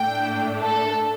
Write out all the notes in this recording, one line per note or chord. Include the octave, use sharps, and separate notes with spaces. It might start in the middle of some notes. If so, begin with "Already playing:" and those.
Already playing: A2 A3 D4 G5
A4